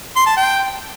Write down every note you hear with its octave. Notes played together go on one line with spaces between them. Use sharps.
C6
A5
G5